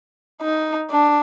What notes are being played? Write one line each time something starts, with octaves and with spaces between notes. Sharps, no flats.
D#4
D4